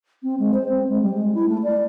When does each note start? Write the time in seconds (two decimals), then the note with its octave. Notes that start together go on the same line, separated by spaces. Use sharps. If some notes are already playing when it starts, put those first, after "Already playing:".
0.23 C4
0.39 G#3
0.54 C5
0.69 C4
0.89 G#3
1.02 G3
1.15 G#3
1.35 E4
1.49 A3
1.63 D5